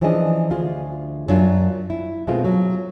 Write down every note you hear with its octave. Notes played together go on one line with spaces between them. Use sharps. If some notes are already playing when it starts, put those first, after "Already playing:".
E3 F3 C#4 D4 G#4 D#5
D2 F4 G#4
F#2 F#3 A#3 D4 F4
E4
B2 G#3 A3 C4 F4
F#3